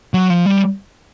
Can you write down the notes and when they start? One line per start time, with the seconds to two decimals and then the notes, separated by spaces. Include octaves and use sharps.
0.14 F#3
0.30 F3
0.46 G3